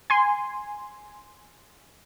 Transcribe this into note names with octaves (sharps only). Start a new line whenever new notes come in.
G#5 C6